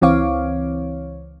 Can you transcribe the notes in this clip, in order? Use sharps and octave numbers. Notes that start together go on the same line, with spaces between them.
C#2 E3 C4 C#5 F5 D6